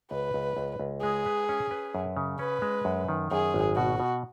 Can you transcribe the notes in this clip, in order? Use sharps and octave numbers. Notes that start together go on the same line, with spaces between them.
C#2 B4
C#2
C#2
C#2
G#3 G#4
B4
C#4
B4
F#2
C#3
C#4 B4
G#3
F#2
D#3
F#2 G#4
G#1
B2 F#4
B2